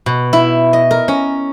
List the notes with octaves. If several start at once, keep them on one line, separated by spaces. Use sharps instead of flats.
B2
E4
D#5
A#4
C#4